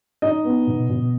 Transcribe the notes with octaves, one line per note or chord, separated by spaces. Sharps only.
D#4 D#5
B3
B2
B2